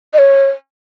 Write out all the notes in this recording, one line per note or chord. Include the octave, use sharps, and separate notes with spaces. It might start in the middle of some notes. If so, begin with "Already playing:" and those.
D#5
C#5